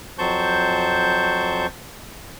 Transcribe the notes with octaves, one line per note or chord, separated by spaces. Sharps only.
F2 F#3 C5 A5 C#6 G6